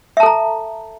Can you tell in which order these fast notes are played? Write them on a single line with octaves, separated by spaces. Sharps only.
E5 A5 A4 A#5